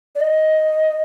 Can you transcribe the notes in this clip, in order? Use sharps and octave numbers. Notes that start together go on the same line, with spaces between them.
D5
D#5